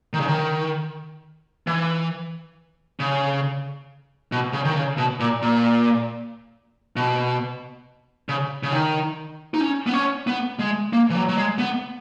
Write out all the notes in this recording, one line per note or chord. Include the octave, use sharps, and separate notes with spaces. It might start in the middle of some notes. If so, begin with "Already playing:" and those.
D#3
C#3
D#3
E3
C#3
B2
C#3
D#3
C#3
B2
A#2
A#2
B2
C#3
C#3
D#3
D#4
C#4
B3
C#4
B3
G#3
A#3
E3
F#3
F#3
G#3
B3